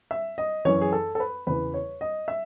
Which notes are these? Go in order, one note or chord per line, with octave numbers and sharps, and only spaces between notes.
E5
D#5
F#2 E3 C#5
G#4
A4
A4
B4
E2 C#3 E3 B4
C#5
D#5
E5